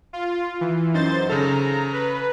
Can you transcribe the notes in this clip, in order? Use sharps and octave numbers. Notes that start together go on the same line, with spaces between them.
F4
E3
F#2 D#4 C5 A6
C#3 A4 A#5
B4